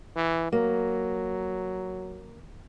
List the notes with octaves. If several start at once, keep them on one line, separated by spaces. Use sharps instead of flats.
E3
F#3 A#3